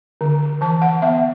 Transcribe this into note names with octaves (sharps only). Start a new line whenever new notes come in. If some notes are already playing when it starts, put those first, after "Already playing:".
D3
E3 A5
F#5
B3 E5